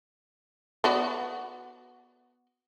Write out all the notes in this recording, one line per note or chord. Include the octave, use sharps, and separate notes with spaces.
B3 F#4 D5